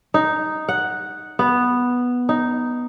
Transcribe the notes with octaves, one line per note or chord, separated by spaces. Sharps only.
D#4
F#5
B3
D#4